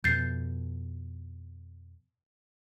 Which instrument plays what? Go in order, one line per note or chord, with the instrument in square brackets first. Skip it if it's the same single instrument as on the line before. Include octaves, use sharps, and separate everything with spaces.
[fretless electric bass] F2 B2 [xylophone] G6 A6 C7